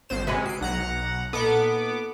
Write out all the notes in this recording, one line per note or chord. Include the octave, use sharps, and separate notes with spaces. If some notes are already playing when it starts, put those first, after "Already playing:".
G#1 C5 E7
C3 G#3 C#4 F#4 B4
F#4 C7 D7
B1 F#5 A#5
A#2 B3 D#4 A4 D6